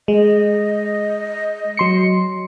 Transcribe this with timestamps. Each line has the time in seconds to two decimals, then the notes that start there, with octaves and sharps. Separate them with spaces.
0.08 G#3 D#5
1.77 F#3 C6 C#7